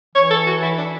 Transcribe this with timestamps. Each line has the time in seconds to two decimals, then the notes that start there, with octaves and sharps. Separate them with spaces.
0.15 E3 C#5
0.31 A4
0.47 F#4
0.63 E4
0.78 D4